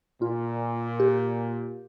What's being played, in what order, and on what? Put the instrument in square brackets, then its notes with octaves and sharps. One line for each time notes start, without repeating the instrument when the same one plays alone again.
[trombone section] A#2 [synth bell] F4
[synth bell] G4